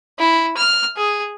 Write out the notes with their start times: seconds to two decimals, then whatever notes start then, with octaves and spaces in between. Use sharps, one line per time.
0.19 E4
0.57 F6
0.96 G#4